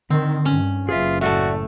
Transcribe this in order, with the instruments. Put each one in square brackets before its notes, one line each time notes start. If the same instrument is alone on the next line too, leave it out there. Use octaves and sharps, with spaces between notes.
[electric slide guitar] D3 [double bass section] D#3 [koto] C4
[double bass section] G2 [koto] C#4
[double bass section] F#1 [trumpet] F4 [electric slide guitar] G#4 B4 E5
[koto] A2 A3 [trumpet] F#4 [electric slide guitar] D5 E5